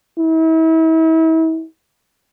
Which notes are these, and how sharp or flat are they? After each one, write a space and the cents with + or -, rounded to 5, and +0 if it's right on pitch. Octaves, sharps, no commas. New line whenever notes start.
E4 -35